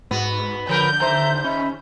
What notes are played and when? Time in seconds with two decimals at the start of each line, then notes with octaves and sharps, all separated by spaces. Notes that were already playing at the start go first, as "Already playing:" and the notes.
0.11 G#2 B3 F#4
0.69 D3 F3 A#4 B4 G6
1.00 D#2 C5 E5 A#5
1.44 C#4 D#5 E5 B5